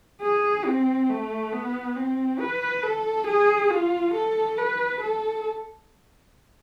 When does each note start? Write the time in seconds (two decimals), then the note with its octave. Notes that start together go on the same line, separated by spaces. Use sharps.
0.21 G#4
0.65 C4
1.09 A3
1.52 B3
1.96 C4
2.40 B4
2.83 A4
3.27 G#4
3.70 F4
4.14 A4
4.57 B4
5.01 A4